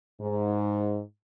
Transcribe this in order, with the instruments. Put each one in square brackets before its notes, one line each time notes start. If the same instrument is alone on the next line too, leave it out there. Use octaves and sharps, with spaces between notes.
[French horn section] G#2